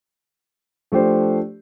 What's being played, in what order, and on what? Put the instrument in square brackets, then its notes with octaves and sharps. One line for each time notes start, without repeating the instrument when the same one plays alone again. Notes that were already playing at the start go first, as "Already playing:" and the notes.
[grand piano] F3 A3 D4 G4 C5